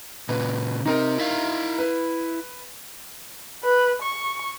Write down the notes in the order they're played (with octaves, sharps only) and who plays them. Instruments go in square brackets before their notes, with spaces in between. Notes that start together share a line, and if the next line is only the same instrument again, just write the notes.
[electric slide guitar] A#2 C#3 [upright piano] B4
[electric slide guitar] C3 C4 [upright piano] D#4 A#4 A#5
[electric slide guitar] E4 E5 F5
[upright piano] B4
[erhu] B4
C#6